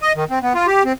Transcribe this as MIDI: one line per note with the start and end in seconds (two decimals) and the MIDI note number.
0.01 0.13 75
0.16 0.24 51
0.30 0.39 60
0.42 0.53 59
0.55 0.67 65
0.67 0.83 67
0.85 0.93 60